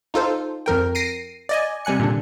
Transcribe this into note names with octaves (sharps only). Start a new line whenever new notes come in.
D#4 F4 A4 C5
F2 F3 A#4 G5
A#6 C7 D7 D#7
D5 D#5 G#5
C3 G3 G#5 F#6 C#7
A#2 D3 D4